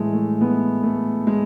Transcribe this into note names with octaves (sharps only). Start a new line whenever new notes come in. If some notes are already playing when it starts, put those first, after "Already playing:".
Already playing: A2 E3 G#3 A3
A3
G#3 B3
A3
G#3